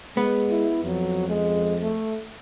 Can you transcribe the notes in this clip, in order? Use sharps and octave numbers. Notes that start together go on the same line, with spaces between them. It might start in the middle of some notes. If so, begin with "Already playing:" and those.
G#3 B3
E4
F2 F#3
G#3
A3